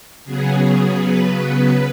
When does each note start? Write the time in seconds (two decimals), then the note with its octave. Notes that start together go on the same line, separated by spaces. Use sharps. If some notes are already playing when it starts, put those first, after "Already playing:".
0.25 C#3 F#3 B3 G#4
1.00 B4